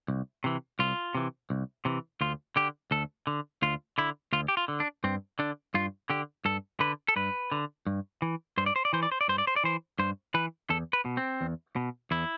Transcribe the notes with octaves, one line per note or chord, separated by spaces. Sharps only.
C2
C3 E3
C2 F4
C3 E3
C2
C3 E3
D2 F4
D3 G4
D2 A4
D3
D2 F4
D3 E4
D2 F4
G4
F4
D3
D4
G2 C4
D3 D4
G2 F4
D3 G4
G2 A4
D3 B4
A4
G2 B4
D3
G2
E3
G2 C5
D5
C5
D5
E3 C5
D5
C5
D5
G2 C5
D5
C5
D5
E3 C5
G2 C5
E3 B4
E2 A4
B4
B2
C4
E2
B2
E2 E4